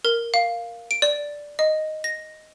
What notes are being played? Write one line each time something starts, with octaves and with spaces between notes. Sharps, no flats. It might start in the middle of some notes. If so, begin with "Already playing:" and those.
A#4
F5
D7
D5
D#5
A#6